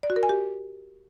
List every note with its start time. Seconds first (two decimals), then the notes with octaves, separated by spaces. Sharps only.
0.03 D5
0.10 F#4
0.16 A#4
0.23 G#5
0.29 G4